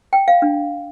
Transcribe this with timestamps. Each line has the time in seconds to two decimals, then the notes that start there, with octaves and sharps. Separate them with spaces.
0.13 G5
0.28 F5
0.42 D4